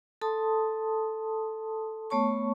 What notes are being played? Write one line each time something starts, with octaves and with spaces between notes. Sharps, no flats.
A4 A5 C6 D#6
A3 B3 C#5 A5 C#6